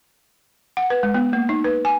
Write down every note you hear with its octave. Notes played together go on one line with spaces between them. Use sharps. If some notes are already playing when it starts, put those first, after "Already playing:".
F#5
B4
G#3
B3
A#3
D#4
B4
G#5